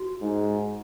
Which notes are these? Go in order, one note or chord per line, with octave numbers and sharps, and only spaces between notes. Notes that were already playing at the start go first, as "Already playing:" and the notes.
Already playing: F#4
G#2